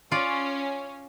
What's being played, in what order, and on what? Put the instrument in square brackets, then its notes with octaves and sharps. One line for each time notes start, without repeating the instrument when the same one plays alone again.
[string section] C#4 [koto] F4 D5